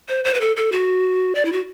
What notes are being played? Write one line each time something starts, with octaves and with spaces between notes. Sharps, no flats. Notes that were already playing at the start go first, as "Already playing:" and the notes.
C5
C5
B4
A4
A4
F#4
D5
E4
F#4